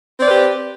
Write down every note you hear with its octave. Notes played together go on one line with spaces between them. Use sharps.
C4 G4 B4 D5